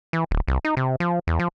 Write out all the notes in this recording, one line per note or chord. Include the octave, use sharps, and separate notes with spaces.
E3
D1
C2
D#4
C3
F3
E2
F3